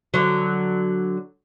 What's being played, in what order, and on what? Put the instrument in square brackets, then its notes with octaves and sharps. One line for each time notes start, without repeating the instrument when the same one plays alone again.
[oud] D3 F#3